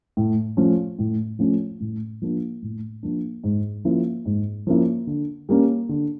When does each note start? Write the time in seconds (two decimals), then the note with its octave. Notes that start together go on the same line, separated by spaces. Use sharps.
0.17 A2
0.57 F3 A3 C#4
0.99 A2
1.39 F3 A3 C#4
1.80 A2
2.22 F3 A#3 D4
2.62 A2
3.03 F3 A#3 D4
3.44 G#2
3.85 F3 A#3 C#4 E4
4.26 G#2
4.67 F3 A#3 C#4 E4
5.07 D3
5.49 G3 A#3 C#4
5.89 D3